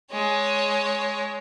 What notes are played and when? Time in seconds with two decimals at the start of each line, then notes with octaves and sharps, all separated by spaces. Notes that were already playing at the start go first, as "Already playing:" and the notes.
0.11 G#3 C#5